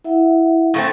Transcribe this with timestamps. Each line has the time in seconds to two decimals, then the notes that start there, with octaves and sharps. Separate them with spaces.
0.04 E4 E5 F#5
0.74 A2 A3 C4